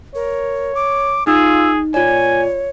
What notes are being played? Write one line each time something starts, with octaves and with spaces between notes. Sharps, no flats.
A#4 C#5
D6
D#4 F4 G#4 E6
A#2 F4 C#5 D5 G#5